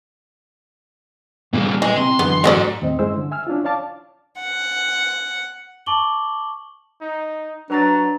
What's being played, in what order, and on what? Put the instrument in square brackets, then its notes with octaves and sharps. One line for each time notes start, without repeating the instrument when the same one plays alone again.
[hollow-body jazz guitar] A#2 C#3 [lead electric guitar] G3 A#3
[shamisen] E3 [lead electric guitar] G#4 D#5
[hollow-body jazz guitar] C3 [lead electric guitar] C6
[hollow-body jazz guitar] F#2 D3 E3 [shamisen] B3
[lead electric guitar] G#2 [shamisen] F#3 A#4 D5
[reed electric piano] D#2 A2 C4 D#5
G2 G#3 C#4 E4 C5 E6
D3
E5 G#5 E6 F6
C#4 D4 E4 F4
C#5 D5 F5 A5 D6
[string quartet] F#5
[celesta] A5 C#6 D6 F#7 G7
[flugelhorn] D#4
[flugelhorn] F#3 [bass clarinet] D4 [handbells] B4 A#5 A6